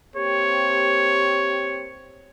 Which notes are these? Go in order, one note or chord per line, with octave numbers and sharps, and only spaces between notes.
A#3 C4 G4 C#5